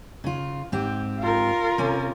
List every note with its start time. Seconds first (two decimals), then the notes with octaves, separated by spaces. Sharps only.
0.24 C#3 F4
0.72 G#2 C4 G4
1.19 F4 A#4
1.78 C3 C#4